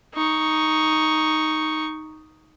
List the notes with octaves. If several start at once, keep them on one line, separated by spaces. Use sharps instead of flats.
D#4 C#6